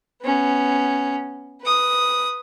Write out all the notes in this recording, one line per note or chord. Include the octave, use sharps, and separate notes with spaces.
B3 C#4
B4 D#6